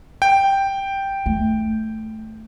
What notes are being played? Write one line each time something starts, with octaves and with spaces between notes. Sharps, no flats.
G5
A3